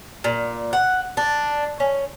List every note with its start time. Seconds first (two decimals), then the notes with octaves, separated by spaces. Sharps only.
0.24 A#2
0.73 F#5
1.17 D4
1.80 C#4